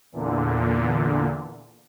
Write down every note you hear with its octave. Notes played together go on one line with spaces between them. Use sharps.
E2 A#2 D3